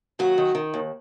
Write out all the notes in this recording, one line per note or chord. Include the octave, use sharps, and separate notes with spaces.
D#2 F#3 F#4
D#3
D#3
D#2